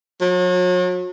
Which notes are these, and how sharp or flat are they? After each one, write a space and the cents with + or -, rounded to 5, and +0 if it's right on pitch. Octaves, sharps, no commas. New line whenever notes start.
F#3 -40